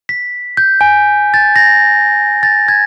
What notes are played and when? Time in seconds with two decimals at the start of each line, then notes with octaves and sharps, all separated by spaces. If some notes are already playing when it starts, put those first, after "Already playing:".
0.09 B6
0.57 G6
0.81 G#5
1.34 A6
1.56 A#6
2.43 A6
2.68 G#6